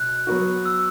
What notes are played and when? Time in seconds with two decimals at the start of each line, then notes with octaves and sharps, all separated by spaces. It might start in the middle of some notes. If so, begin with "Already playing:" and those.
Already playing: B2 F#6
0.27 F#3 B3 F#4
0.65 E6